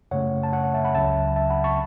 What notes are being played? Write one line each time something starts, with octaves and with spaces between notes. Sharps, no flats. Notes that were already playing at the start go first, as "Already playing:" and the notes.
F#2 C#3 A3 C#5 F#5
A5
C#5 F#5
C#5 F#5
E5 A5
F#5 B5
C#2 C#3 F#3 E5 A5
E5 A5
F#5 B5
A5 C#6